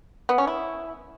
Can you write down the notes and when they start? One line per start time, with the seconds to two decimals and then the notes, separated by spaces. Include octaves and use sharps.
0.29 B3
0.38 C#4
0.47 E4